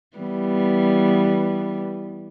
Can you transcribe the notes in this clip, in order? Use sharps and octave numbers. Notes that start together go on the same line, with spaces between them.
E3 G3 B3